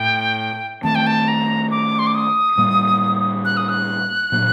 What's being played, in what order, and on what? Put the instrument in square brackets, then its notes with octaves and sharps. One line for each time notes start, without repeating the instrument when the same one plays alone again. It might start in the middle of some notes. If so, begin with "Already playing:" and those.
Already playing: [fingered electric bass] A2 A3 C4 [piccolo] G5
[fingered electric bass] D#3 A3 C4 [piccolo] A5
[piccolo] G5
A5
A#5
D6
C6
D6
D#6
[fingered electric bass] A2 G3 A#3
[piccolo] F#6
D#6
F#6
[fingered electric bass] A#2 F#3 A#3 D4